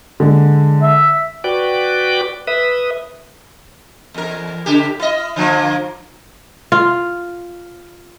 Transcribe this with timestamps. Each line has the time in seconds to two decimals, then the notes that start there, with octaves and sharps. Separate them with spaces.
0.20 D3 G#3
0.83 E5
1.44 F#4 B4 D5 G5 D6
2.47 B4 E5 D#6
4.14 E2 A#4
4.66 C#3 G4
4.99 E4 D#5
5.36 D3 F3 A#3
6.72 F4